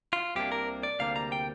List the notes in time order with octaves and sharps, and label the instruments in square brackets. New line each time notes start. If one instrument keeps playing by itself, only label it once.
[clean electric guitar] F4
C2 C3 A#3 D4 G4
A#4
D5
D2 C3 G3 A#3 D4 F5
A#5
G5